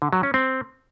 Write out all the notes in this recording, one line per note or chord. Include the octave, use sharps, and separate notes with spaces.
D3
F#3
C#4
C4